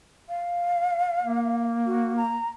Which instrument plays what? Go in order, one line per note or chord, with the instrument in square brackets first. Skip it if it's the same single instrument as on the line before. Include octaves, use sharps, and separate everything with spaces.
[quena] F5
[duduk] A#3
[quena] F#4
A#5